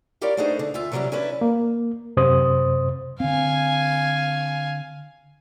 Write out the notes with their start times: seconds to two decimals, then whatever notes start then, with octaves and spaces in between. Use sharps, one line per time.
0.21 E4 G4 A#4 C#5 D5 F5
0.37 A3 B3 D4 D#4 G#4 C5
0.59 D3
0.74 D2 F4 E5
0.92 C3 E3 F#3 G3 C#4 E4
1.12 C#4 D4 E4 B4
1.41 A#3
2.17 F#2 C3 C5 D#6
3.20 D3 C4 F5 G#5